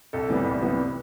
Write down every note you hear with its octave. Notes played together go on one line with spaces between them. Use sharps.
C2 A4
C3 E3 G3 B3
C2
C3 E3 G3 B3